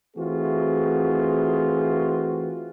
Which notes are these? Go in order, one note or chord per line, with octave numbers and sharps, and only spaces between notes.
E3 A3 C4 F4 F#4 G#4